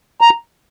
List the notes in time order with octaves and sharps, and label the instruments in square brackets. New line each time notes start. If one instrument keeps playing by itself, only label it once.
[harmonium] A#5